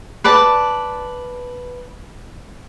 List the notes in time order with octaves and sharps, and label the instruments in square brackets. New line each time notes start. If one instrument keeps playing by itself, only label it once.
[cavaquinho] B4 D5 A5